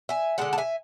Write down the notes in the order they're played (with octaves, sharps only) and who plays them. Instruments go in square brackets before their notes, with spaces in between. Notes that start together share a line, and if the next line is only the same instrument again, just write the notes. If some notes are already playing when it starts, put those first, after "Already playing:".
[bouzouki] E5 G#5
D3 G#3 F#5 A5
A5
E5 G#5